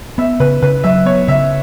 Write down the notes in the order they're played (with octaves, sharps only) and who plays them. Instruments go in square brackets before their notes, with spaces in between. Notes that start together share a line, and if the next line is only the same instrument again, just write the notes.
[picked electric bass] B3 [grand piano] E5
[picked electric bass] C#3 [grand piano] B4
[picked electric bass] C#3 [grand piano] B4
[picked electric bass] F#3 [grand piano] E5
[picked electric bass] B3 [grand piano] C#5
[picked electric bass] C#3 [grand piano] E5